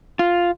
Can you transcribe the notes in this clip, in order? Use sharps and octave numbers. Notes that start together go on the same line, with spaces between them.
F4